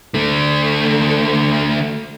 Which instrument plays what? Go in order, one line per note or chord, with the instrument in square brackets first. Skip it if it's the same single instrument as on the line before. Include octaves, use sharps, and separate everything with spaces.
[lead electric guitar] D3 A3